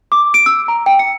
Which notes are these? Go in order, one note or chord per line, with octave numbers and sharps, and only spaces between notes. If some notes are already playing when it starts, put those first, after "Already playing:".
D6
D7
E6
A#5
G5
C#7